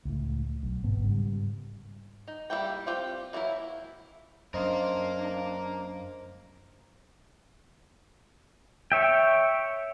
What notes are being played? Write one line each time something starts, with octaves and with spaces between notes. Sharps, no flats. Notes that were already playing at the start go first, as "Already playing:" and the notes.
C#2 A2
B1
G1 G#2 B3
G#2 C#3 G3
D#4
G3 A#3 E4 G5
C4 F4 G4
E3 F#3 A#3 E4
F#2 D4 A#4 C5 D#5 F5 C6
C#5 E5 G5